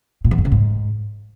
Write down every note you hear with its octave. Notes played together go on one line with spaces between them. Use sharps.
A#2
E2
G2
C#3
G#2